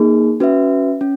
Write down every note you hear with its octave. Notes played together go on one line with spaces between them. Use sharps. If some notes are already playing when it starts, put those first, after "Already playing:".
Already playing: A#3 D#4 G#4
C#4 F#4 B4 E5
C#4